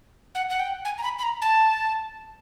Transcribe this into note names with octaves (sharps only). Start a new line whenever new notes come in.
F#5
F#5
G5
G#5
A#5
B5
B5
A#5
A5